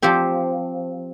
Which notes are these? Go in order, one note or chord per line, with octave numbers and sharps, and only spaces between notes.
F3 C4 G4